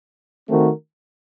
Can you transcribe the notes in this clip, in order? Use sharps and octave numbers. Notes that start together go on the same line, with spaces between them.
D#3 A3 C4 F#4 A#4